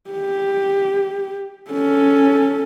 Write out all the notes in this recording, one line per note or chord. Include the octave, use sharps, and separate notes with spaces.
G4
C#4 A4